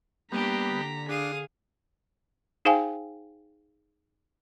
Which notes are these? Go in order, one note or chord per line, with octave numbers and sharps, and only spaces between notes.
G3 A#3 B3 D4 G4 A#5 B6
D3
D4 G#4 F5 D#6
D#4 G#4 C5 F5 G5 G#5